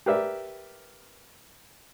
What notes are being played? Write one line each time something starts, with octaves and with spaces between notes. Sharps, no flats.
G4 A#4 B4 D5 E5